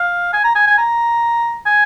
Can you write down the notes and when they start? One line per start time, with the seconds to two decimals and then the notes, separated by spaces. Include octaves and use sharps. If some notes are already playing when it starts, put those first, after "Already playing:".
Already playing: F5
0.33 G#5
0.44 A#5
0.55 G#5
0.67 G#5
0.78 A#5
1.66 G#5